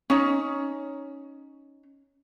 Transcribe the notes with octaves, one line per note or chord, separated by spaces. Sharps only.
C#4 D#4